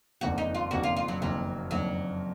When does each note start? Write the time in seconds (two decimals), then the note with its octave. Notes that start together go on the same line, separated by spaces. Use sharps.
0.21 F#1 F2 D#3 A#3 D4 F#4
0.38 D#4
0.55 F4
0.71 F#1 F2 D#3 A#3 D4 F#4
0.83 F4
0.96 F4
1.08 F#3
1.21 F#1 F2 D#3 F#3 A#3 D4
1.71 F#1 F2 D#3 F#3 A#3 D4